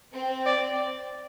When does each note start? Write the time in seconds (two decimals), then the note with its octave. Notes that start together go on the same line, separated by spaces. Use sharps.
0.13 C4
0.46 D5